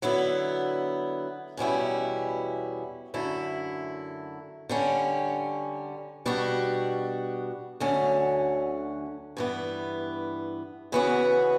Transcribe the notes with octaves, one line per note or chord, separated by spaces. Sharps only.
D3 F#3 B3 E4
E2 B2 G3 C#4 E4
F#2 D3 A3 E4
D3 G3 C#4
B2 G3 D4 F#4
D2 D3 F#3 C#4
G2 E3 B3
C#3 E3 B3 F#4